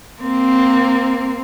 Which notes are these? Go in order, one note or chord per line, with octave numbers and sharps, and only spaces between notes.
A#3 C4